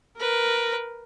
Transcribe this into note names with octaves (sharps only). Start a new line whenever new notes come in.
A#4 B4